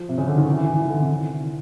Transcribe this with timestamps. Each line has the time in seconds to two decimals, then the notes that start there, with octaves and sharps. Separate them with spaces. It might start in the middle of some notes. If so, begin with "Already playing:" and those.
Already playing: F3
0.09 C3
0.18 C#3
0.27 D3
0.38 D#3
0.47 E3
0.58 E3
0.68 E3
0.79 D#3
0.89 D3
0.99 C3
1.43 E3